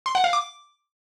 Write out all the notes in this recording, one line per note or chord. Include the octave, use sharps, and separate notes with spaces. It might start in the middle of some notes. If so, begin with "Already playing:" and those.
C6
F#5
F5
D6